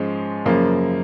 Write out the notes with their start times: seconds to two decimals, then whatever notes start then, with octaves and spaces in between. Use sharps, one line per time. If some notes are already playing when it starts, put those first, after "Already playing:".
Already playing: G#2 F3 G#3 C#4
0.45 F#2 C#3 F3 A#3